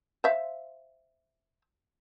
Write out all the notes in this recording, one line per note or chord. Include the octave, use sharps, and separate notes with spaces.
C5 E5 F5